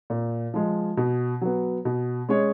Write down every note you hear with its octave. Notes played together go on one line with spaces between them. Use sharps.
A#2
F3 G#3
B2
F#3 B3
B2
G#3 C#4 G#4 C#5